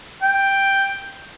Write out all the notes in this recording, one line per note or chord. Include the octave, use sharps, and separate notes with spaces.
G5